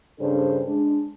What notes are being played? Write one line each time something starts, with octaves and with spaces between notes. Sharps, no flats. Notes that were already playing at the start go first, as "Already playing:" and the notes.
G2 C#3 D4 A4 C5
G#3 D4